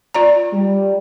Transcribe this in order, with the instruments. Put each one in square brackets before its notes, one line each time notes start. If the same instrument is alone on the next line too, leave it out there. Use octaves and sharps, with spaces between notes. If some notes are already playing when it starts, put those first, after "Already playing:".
[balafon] F4 D5 A#5
[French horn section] G3